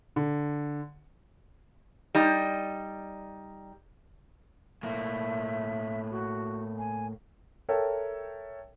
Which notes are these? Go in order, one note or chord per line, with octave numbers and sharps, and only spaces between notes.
D3
G3 D#4
A2 A#3 E5
F#4
G#5
A4 A#4 C#5 E5 G5